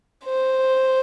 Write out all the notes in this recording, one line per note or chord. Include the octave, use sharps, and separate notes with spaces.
C5